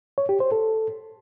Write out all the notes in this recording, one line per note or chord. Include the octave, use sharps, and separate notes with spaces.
C#5
G4
C5
A4